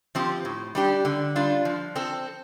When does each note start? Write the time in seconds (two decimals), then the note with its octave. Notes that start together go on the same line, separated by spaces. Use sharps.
0.15 F3 C4 G4
0.45 A2
0.75 G3 D4 G4
1.05 D3
1.36 G3 D4 F4
1.65 F3
1.96 C4 A4